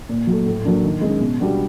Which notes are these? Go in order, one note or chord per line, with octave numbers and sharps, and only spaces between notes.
A#2
F#3
A3
A2
F#3 A#3 D4
D#3
G#3 C#4
B2
G3 B3 D4 F#4